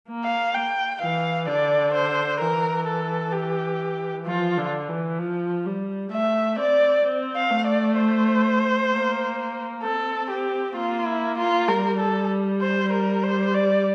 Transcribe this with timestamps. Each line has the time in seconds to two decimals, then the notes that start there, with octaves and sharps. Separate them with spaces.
0.09 A#3
0.25 F5
0.54 G5
1.01 E3 F5
1.48 D3 D5
1.94 C5
2.41 E3 A#4
2.88 A4
3.33 G4
4.26 F3 F4
4.57 D3
4.88 E3
5.19 F3
5.66 G3
6.12 A3 E5
6.58 C4 D5
7.05 C4
7.35 F5
7.51 A3
7.67 D5
7.98 C5
8.91 A#3
9.83 C4 A4
10.30 G4
10.76 A#3 F4
11.07 E4
11.39 F4
11.68 G3 A#4
12.00 A4
12.62 C5
12.93 A#4
13.23 C5
13.55 D5